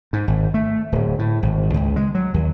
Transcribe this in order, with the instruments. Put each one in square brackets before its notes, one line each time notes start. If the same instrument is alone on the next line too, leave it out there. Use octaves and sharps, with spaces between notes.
[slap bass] G#2
G#1
A3
D1
A2
G#1
C#2
G#3
F#3
D#2